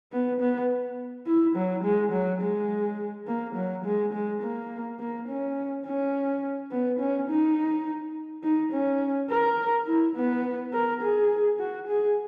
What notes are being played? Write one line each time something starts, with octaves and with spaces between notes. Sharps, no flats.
B3
B3
E4
F#3
G#3
F#3
G#3
A#3
F#3
G#3
G#3
A#3
A#3
C#4
C#4
B3
C#4
D#4
D#4
C#4
A#4
E4
B3
A#4
G#4
F#4
G#4